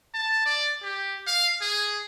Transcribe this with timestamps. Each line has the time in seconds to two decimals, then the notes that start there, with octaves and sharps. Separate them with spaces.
0.14 A5
0.46 D5
0.82 G4
1.27 F5
1.61 G#4